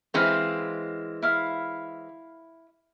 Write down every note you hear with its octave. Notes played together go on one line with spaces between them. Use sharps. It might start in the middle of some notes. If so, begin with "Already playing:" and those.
E3 G#3 C4 C5 F5
E4 F5 B5